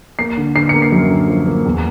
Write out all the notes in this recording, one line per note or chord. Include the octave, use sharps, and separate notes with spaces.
A#3 C7
D3
D3 C7
A#3 C#7
C7
F#2
D3
F3
A#3
E2